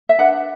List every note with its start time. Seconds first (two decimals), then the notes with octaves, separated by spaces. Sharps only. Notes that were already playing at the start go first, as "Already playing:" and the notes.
0.09 E5
0.19 D4 B4 F#5